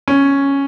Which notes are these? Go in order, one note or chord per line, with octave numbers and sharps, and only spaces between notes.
C#4